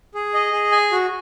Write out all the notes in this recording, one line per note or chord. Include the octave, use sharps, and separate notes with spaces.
G#4
D#5
G#4
G#5
F#4